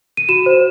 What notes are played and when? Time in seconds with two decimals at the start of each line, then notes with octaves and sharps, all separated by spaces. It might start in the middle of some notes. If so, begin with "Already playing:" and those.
0.17 D#7
0.29 F#4 E7
0.46 C5